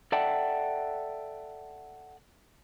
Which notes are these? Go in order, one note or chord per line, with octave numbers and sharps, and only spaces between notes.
A4 D5 E5 F#5 G5 A5